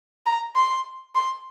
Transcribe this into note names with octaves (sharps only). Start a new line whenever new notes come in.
A#5
C6
C6